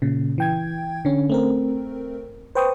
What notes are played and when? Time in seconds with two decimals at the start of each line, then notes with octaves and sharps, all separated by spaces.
0.02 A#2 C#3
0.38 E3 G5 G#6
1.05 D3 C#4
1.30 A3 C4 A#4
2.55 B4 C5 G5 C#6 D#6